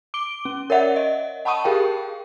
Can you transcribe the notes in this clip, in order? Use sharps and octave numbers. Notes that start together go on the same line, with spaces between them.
D6 D7 G7
C#4
A#4 C#5 D5 E5 F#5
D#5
F#5 A5 B5 C#6 D#6 D#7
G4 G#4 A#4 F5 G5